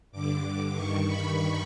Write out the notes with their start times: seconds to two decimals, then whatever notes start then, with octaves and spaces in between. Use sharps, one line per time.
0.12 G2 D3 D6
0.74 G2 D#3 C#6
1.05 B5